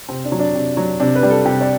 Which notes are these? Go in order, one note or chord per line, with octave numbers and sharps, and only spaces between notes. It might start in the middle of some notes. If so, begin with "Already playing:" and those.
C3 C4
D4
F#3
D4
C3
F#3
C3 D4
B4
G3
A4
C3 G4
D5